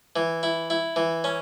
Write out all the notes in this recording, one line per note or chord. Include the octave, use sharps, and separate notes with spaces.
E3
E4
E4
E3
C#4